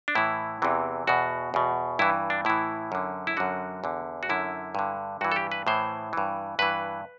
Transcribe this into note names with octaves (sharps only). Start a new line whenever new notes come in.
D4
A2 E3 E4
E2 C3 E3
E2 B2 F#4
E2 B2
G2 E3 E4
D4
A2 E3 E4
F#2 D3
E4
F#2 D3 F#4
E2 D3
F#4
F#2 D3 E4
G2 D3
G2 E3 F#4
A4
G4
B4
A2 E3 C5
G2 E3
G2 E3 B4